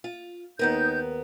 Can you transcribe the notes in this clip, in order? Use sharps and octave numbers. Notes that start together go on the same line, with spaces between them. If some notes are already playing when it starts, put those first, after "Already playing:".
F4
D#2 B3 D#4 A#4 G6